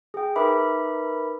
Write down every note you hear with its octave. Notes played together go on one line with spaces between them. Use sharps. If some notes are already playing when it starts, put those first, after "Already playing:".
G#4 G5
D#4 A#4 B4 E5 B5 D6